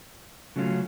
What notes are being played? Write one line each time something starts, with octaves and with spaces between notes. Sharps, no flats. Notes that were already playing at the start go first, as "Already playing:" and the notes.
C#3 F#3 A3 C#4 F4